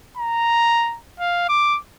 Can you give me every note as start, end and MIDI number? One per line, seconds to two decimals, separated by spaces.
0.17 0.97 82
1.20 1.49 77
1.49 1.78 86